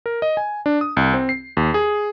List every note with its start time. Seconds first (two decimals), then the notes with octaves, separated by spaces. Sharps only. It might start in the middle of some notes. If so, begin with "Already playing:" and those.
0.06 A#4
0.22 D#5
0.37 G#5
0.66 D4
0.81 D#6
0.97 C2
1.14 C4
1.29 C7
1.57 D#2
1.74 G#4